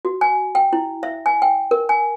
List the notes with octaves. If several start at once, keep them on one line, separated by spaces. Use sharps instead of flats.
F#4
G#5
G5
E4
E5
G#5
G5
A#4
G#5